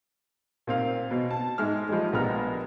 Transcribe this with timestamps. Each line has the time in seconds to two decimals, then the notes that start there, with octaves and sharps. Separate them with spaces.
0.67 A#2 C4 F5
1.11 B2
1.31 A5
1.58 G#2 G#3 E5 F6
1.89 F3 G3 G#3
2.13 A#1 G3 G#3 B3 A#5 F6